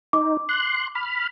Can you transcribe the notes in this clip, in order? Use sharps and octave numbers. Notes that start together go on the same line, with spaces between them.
D#4 D6
C6 F#6
B5 F6